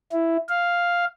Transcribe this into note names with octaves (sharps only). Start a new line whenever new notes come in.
E4
F5